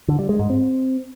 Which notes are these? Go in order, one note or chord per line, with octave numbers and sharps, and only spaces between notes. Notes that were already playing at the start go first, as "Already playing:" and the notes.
D3
G3
G#3
G#2
C4